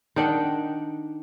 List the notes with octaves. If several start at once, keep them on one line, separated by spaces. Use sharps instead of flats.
D#3 D4 F#5 G5